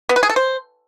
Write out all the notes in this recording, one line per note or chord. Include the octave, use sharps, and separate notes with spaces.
B3
B4
G#4
A4
C5